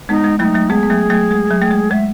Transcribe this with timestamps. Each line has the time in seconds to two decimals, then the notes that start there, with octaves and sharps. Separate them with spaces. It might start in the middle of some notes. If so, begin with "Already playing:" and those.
0.09 G#3 B3 D#4
0.24 G#3
0.39 F#3 A3 D#4 E4
0.54 F#3 A3
0.70 G#3 B3 G#4
0.83 B3
0.90 F#3 A3
1.10 F#3 A3
1.31 G#3
1.51 F#3
1.62 A3
1.71 G#3
1.91 G#3 E5